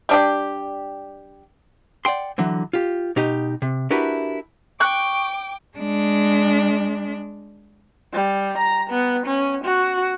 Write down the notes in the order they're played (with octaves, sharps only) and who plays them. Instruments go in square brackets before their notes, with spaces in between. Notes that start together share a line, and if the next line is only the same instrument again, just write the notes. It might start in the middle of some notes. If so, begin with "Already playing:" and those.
[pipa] G3 D4 G4
[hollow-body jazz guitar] D5 F#5 G5 C6
D3 E3 F#3
F4 G4
B2 D#4 G4 D#5
C3
D4 E4 F#4 G4 A#4 B4
[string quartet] G5 D6 [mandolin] C#6 F#6
[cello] G#3 D4
[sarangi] G3
A#5
B3
C#4
F#4